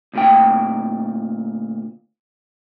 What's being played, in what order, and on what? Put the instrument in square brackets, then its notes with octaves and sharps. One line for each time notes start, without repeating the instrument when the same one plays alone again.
[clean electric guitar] D2 A#2 G5